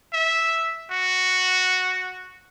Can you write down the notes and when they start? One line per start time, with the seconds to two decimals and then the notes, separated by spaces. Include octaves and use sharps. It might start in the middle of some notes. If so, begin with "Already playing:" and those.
0.13 E5
0.91 F#4